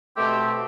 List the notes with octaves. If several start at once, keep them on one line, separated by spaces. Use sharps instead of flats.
B2 A3 C4 G4